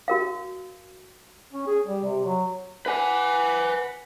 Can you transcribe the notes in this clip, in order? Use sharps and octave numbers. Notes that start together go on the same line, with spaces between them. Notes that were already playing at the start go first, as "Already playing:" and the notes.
F#4 A#4 F5
C#4
G#4
G3
C3
F#3
B4 F#5 G#5 B5